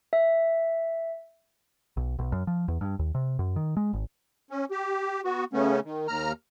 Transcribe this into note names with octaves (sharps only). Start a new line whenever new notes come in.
E5
B1
B1
F#2
F3
E2
G2
D#2
C3
F#2
D#3
G#3
G#1
C#4
G4
B3 F#4
C#3 A3 B3 C#4
D#3
D#2 A#5 F6